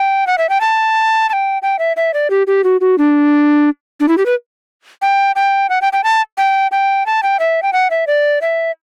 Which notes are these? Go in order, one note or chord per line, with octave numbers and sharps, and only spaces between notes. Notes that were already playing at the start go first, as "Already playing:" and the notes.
Already playing: G5
F#5
E5
G5
A5
A5
G5
G5
E5
E5
D5
G4
G4
F#4
F#4
D4
D4
E4
G4
B4
G5
G5
F#5
G5
G5
A5
G5
G5
A5
G5
E5
G5
F#5
E5
D5
E5